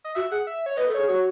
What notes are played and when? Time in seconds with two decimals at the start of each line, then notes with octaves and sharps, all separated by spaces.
0.04 D#5
0.15 F#4 E5
0.31 G#4 F#5
0.47 E5
0.66 C#5
0.77 B4 D#5
0.88 A4
0.94 G#4 C#5
1.09 F#4 C#5